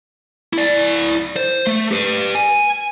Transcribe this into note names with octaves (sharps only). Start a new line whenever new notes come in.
E4 D5
C5
A3
G4 B4
G#5